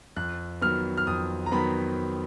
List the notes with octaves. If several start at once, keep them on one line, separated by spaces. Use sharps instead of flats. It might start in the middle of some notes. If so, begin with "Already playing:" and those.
F2 F#6
D#3 F#3 B3 F6
F6
F2 D#6
A#5
D#3 F#3 B3 B5